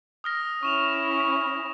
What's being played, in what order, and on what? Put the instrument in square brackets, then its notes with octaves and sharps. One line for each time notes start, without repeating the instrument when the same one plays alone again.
[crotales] D#6 F6 A#6
[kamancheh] C#4 E4 [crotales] C#6 E7 F7